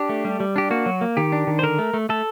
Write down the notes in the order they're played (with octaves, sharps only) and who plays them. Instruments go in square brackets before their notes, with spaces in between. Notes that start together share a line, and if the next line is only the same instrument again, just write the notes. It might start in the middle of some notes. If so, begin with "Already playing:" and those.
Already playing: [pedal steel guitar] D4 G4
A3
G3
G3
D4 G4
A#3 F#4
F#3
A#3
D#3 G4
D4
D#3
C5
D3 A#4
A3
A3
A3 A4